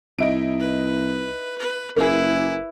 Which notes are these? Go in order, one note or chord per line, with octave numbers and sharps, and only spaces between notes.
C2 D#4 E4 D7
B4
B4
F#1 A#3 E4 G#4 B4